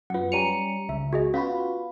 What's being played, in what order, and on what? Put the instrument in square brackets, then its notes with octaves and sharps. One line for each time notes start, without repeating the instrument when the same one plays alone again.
[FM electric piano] F#2 B3 [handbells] F4 F#5
[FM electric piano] G3 C#4 C#7 [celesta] A#5 D#7 F7
[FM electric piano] C#2 [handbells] E5
[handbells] F#4 G#4 D#5
[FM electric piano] B3 F4 F#4 [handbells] C#4 [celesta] F5 B5